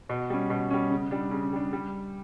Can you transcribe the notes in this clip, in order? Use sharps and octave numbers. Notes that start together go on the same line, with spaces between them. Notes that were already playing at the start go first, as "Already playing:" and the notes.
B2
G3 C#4
B2
G3 C#4
C#3
G3 D4
C#3
G3 D4
G3